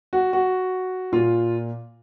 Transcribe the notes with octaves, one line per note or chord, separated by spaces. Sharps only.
F#4
F#4
A#2 F4